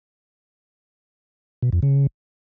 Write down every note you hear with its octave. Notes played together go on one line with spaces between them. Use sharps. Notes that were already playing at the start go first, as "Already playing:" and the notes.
B2
F2
C#3